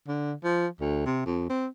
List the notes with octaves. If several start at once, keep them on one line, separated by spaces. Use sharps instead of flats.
D3
F3
D2
C3
F2
C4